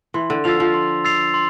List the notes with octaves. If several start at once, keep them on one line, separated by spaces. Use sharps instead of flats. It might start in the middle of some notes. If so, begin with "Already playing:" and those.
E3 C6
D3
F3 E6 A6 C7 F7
F3
C6
E6 A6 C7 F7
C6